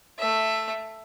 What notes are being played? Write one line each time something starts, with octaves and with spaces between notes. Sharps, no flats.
A3 E5